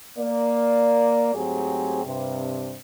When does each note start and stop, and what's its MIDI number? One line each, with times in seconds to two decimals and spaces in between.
0.18 1.32 58
0.18 1.32 74
1.35 2.01 44
1.35 2.01 54
1.35 2.01 57
1.35 2.01 60
1.35 2.01 67
1.35 2.01 68
2.05 2.74 43
2.05 2.74 48